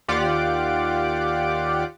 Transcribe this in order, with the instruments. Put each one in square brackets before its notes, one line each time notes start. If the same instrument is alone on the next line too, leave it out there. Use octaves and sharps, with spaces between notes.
[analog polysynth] D#2 F4 G4 D5 F#5 D6